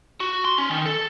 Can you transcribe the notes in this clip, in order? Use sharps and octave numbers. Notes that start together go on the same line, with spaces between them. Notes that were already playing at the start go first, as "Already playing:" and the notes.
F#4
C6
C#4
D#3
A4